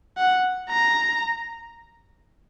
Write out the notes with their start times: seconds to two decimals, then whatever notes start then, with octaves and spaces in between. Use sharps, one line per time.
0.17 F#5
0.69 A#5